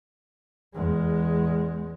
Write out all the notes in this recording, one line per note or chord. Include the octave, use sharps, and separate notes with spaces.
E2 G#3